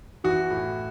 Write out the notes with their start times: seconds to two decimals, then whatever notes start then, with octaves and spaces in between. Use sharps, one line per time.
0.24 E3 F#4
0.50 A2